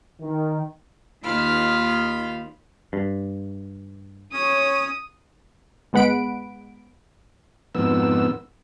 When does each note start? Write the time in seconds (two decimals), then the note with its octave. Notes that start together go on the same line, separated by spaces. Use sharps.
0.21 D#3
1.24 D#2 D#3 F4 B5 F6
2.93 G2
4.33 C#4 C#5 D#6
5.93 G1 G#3 B3 F#5 B5 D7
7.75 F2 G#2 B3 E6